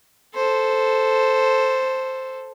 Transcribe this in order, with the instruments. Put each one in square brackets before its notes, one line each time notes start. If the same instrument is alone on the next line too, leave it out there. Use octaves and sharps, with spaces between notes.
[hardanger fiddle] A4 C5